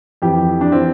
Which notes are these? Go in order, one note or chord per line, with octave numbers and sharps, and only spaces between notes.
F2 E3 G4
D4
E3 C4